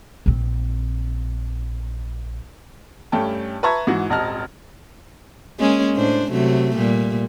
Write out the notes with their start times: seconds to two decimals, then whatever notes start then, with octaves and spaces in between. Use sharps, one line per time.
0.26 A#1 C4
3.12 G2 A3 C#4 G5 A5
3.63 B4 E5 A5 A#5 C#6 G#6
3.87 G#2 E3 F#4
4.10 D#1 G#1 D#5 A5 A#5 F6
5.60 G#3 A#3 C#4
5.95 A2 D4 C5
6.31 C3 F#3 A3
6.75 A#2 G3